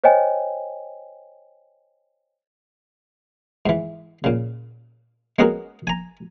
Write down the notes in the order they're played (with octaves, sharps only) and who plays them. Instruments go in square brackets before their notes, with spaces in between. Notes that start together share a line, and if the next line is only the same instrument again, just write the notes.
[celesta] C5 C#5 D#5 G5 G#5
[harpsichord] G#2 E3
A#2 C#3
G#3 B3 C#4 F#4 G#4 A#4
G#5 A#5